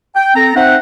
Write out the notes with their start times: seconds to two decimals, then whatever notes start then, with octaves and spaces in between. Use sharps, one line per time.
0.15 G5
0.35 C4 A4 A#5
0.55 C4 D#4 C5 E5 F#5